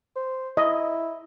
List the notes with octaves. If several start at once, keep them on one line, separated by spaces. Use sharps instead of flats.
C5
E4 D#5